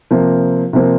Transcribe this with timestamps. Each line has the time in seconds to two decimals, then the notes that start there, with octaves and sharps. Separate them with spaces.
0.11 C3 F3 A#3
0.73 C3 F3 A#3